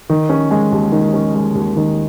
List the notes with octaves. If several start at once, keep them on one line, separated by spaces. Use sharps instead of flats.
D#3
C#4
G#3
D#2
D#3
C#4
G#3
D#2
D#3